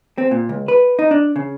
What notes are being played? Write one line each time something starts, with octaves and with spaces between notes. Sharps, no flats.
C4
A#2
C#2
B4
D#4
D4
C#3